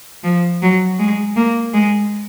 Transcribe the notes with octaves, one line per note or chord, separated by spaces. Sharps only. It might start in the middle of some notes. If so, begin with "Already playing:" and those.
F3
F#3
G#3
A#3
G#3